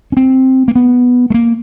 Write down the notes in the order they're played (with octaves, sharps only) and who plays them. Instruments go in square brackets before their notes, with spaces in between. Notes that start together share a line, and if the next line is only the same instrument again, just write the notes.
[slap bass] C#4
C4
A#3
B3
A3
A#3